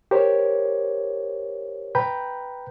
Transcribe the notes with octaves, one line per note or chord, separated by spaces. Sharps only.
G4 A#4 C5 C#5
B4 G5 A#5 B5 G6